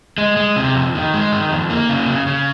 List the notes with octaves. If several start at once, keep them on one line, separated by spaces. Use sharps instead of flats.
G#3
G#3
C3
F2
D#3
G#3
D#3
F2
A#3
C#3
C#3
C#3